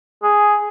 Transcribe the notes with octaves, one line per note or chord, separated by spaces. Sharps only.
G#4